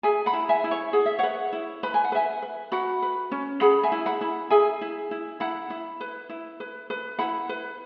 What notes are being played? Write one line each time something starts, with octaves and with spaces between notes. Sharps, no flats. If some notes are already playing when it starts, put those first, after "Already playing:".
G#4 E5 G#5
F#5 B5
E4
E5 G#5
E4
C#5
G#4 F#5
E5
B4 C#5 F#5
E4
B4 B5
G#5
F#5
B4 E5 G#5
B4
F#4 F#5 B5
B4
C#4
G#4 F#5 B5
E5 G#5
E4
F#5 B5
E4
G#4 E5 G#5
E4
E4
E4 F#5 B5
E4
B4
E4
B4
B4
E4 F#5 B5
B4